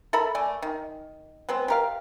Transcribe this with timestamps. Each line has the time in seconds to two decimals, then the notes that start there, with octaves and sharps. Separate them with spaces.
0.13 A4 A#4 E5 B5
0.35 A3 D5 G#5
0.62 D#3
1.49 F#3 G#3 B3 C4
1.68 G4 A#4 F5